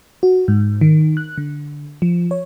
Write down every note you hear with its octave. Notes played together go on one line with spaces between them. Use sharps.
F#4
G#2
D#3
F#6
D3
F3
C#5